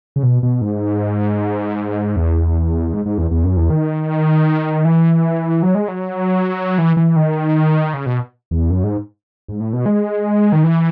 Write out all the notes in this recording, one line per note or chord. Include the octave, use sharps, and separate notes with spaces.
C#3
B2
B2
G#2
E2
G#2
G#2
E2
E2
F#2
E2
D#3
E3
F#3
G#3
F#3
E3
E3
D#3
C#3
B2
E2
F#2
G#2
G#2
A2
B2
G#3
D#3
E3